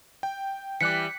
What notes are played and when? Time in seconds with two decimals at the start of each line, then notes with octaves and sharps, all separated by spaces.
0.23 G5
0.81 E3 G3 D6 F#6 B6 C#7